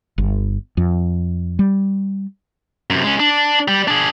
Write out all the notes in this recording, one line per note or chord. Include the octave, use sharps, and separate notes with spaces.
G1
F2
G3
F#2 C3
G#3 C#4
D4
G3
D4 G#4